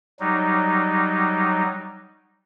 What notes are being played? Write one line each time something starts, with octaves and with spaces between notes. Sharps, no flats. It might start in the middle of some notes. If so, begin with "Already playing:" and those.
F#3 G3 D#4